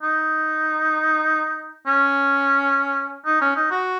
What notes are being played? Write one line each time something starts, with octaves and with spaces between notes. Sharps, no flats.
D#4
C#4
D#4
C#4
D#4
F#4